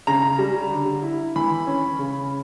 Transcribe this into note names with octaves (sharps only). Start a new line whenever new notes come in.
C#3 A#5
G3
D3
E4
E3 B5
C#4
C#3